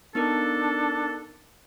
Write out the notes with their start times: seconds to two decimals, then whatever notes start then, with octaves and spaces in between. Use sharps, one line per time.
0.15 B3 D4 D#4 A4 A#4